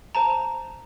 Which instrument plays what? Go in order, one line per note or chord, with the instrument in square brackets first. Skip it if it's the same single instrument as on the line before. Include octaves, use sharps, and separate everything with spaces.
[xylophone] C5 A5 A#5